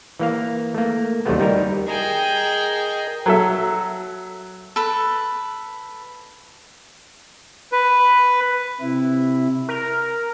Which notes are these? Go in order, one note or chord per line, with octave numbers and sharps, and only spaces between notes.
E3 A#3 F5
A3 A#3
D#2 C3 F#3 G3 A3 B3
G3 D#4 E4 A#4
G#4 A#4 D#5 G5 A#5
F#3 A4 E5
A4 B4
B4
C3 E4
A#4